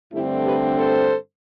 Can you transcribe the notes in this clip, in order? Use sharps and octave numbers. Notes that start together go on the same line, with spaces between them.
G2 D3 A3 C4 E4 G4
G4 B4
A4 C5